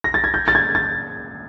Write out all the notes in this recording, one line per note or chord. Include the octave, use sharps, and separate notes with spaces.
A#6
A6
G#6
G6
A6
G#6
A6